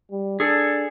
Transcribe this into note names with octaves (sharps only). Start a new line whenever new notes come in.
G3
D4 G#4 A4